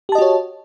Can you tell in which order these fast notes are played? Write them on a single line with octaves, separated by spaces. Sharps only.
G4 A5 D#5 F#4 C#5